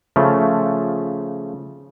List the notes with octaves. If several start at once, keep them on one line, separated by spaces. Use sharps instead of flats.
C#3 F3 A3